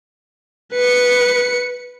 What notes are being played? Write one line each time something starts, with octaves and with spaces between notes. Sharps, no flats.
B4 C#7